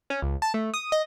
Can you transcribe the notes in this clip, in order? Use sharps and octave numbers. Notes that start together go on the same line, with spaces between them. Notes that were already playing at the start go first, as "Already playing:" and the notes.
C#4
C#2
A5
A3
D#6
D#5